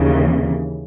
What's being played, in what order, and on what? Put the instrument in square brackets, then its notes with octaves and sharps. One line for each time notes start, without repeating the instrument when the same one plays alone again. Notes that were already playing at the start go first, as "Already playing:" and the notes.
Already playing: [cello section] D#2 C#3 E3